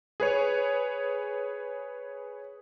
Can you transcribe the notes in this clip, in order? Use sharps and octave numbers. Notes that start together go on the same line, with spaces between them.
G#4 B4 C#5